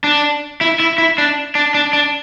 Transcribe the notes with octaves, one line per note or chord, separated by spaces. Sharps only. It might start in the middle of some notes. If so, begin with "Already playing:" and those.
D4
E4
E4
E4
D4
D4
D4
D4